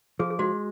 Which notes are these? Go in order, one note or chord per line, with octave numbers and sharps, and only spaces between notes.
F3 G#4
G#4
G#3 F#4